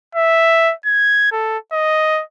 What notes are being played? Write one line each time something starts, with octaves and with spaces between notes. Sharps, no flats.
E5
G#6
A4
D#5